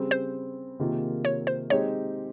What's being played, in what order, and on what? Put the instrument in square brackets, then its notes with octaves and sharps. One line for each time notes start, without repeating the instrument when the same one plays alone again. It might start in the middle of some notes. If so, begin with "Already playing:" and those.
Already playing: [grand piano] C#3 G3 C4
[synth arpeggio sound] C5
[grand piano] C3 D#3 A#3 F4 G#4
[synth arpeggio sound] C#5
C5
[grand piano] G#3 C4 D#4 G4 [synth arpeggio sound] C#5